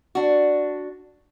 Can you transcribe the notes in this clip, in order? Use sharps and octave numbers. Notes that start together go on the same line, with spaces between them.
D4 F#4